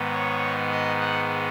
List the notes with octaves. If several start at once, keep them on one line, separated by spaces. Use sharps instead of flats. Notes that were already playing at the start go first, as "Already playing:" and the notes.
Already playing: G#2 D#3 B3
C#5
D#5
F#5